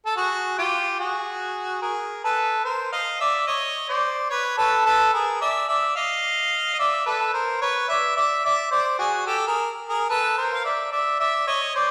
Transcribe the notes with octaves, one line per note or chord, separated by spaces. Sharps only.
A4
F#4 G#4
F4 G4
F#4 G#4
G#4 A#4
A4 B4
A#4 C5
D#5 F5
D5 E5
C#5 D#5
C5 D5
B4 C#5
A4 B4
A4 B4
G#4 A#4
D5 E5
D5 E5
D#5 F5
D#5
D5 E5
A4 B4
A#4 C5
B4 C#5
D5 E5
D5 E5
D5 E5
C5 D5
F#4 G#4
G4 A4
G#4 A#4
G#4 A#4
A4 B4
A#4 C5
F5
D5 E5
D5 E5
D5 E5
C#5 D#5
C5 D5